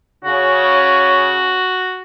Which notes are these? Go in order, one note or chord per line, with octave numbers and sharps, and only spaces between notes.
C#3 C#4 F#4